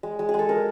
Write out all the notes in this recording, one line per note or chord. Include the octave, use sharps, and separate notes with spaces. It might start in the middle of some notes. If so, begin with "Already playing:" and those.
G#3
G#3
G#4
G#3 A4
G#3 A#4